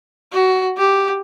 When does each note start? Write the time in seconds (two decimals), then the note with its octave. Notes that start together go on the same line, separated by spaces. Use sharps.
0.32 F#4
0.77 G4